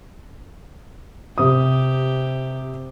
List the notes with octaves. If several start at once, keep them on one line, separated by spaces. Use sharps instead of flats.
C3 G4 D#6